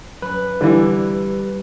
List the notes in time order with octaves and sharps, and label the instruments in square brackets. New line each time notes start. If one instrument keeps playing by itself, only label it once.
[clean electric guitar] F#2 [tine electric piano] B4
[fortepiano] D3 E3 [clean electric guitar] G3